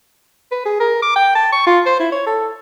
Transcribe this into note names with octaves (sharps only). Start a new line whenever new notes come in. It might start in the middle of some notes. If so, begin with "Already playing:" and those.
B4
G#4
A#4
D6
G5
A5
C#6
F4
C5
E4
C#5
A4